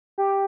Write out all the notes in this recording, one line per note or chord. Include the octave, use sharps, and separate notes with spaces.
G4